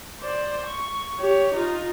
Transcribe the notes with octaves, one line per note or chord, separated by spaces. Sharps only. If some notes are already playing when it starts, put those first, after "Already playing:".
C5 D5
C#6
G4 C#5
D#4 F4